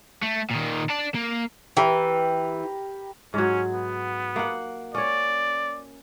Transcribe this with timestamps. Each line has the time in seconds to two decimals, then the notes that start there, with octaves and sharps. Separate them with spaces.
0.23 A3
0.51 A#2 D#3
0.90 D5 A5
1.15 A#3
1.77 E3 G4 A#4 B5
3.34 G#2 F#3 C#4
3.72 B3
4.36 A#3 F#5
4.95 C#4 C#5 D5